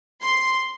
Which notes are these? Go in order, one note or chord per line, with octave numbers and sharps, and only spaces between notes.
C6